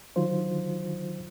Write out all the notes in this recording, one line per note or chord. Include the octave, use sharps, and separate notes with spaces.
D3 D#3 F#3 F4 C5